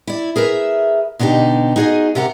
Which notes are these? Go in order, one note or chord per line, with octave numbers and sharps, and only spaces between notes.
E4 D5
G#4 A#4 B4 E5
B2 D3 D4 D#4 G4
D#4 F#4 G#4 C#5 D#5
C3 G4 A#4 F#5 A#5